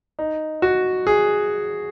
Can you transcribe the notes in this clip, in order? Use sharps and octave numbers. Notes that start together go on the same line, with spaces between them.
D#4
F#4
G#4